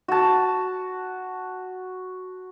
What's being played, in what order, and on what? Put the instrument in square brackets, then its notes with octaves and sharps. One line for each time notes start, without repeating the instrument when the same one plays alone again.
[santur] F#4 A5